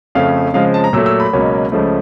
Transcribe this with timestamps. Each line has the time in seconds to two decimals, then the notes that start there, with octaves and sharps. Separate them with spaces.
0.15 F2 C#3 F3 A3 C#4 F5
0.54 C#3 F3 G#3 C4 F5
0.74 A5
0.84 A#5
0.93 A#2 F#3 A3 E6
1.06 E6
1.20 B5
1.33 C#2 B2 F#3 A#3 C#4
1.72 C#2 C#3 F3 A3